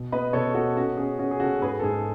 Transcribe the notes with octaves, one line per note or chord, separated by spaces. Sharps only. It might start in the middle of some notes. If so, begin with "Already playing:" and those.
Already playing: B2
B3 B4 D#5
B2 A4 C#5
B3 F#4 A4
C#4 F#4
C#4 G#4
C#4 F#4
G#4
C#3 F#4 A4
G#2 G#4 B4
A4
G#2 G#4